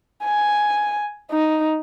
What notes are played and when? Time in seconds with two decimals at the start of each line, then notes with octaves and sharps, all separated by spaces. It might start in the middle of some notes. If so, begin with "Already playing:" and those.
0.24 G#5
1.31 D#4